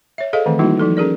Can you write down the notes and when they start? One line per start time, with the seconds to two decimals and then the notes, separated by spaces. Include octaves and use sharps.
0.18 C#5 E5
0.33 G#4 A4 C5 D#5 F5
0.46 D#3 E3 A3 C4
0.59 G3 A#3 D#4 E4 F#4
0.79 F3 D#4 A4
0.97 C#4 G#4 A#4 D5